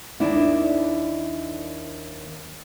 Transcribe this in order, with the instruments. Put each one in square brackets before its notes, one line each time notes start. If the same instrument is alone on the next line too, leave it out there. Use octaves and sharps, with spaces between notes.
[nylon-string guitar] D#2 A#3 D4 E4